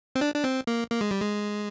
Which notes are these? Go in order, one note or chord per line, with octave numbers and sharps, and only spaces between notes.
C4
D4
D4
C4
A#3
A#3
G#3
G3
G#3